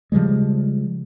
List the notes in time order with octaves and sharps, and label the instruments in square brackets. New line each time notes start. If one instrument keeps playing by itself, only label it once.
[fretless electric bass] C#3 F3 G3 G#3